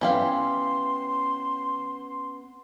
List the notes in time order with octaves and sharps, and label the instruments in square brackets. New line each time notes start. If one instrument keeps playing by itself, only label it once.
[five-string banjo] E3 G4 F5 [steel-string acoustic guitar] B3 C#4 [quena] C6